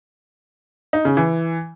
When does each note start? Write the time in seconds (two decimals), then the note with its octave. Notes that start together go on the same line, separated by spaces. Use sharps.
0.93 D#4
1.05 C#3
1.17 E3